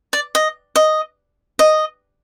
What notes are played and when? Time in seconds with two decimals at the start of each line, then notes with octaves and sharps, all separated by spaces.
0.13 D5
0.35 D#5
0.76 D#5
1.59 D#5